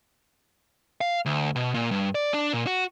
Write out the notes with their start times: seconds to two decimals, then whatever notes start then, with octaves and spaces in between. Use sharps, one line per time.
1.01 F5
1.26 D2
1.56 B2
1.74 A#2
1.91 G2
2.15 D5
2.34 D4
2.53 A#2
2.67 F#4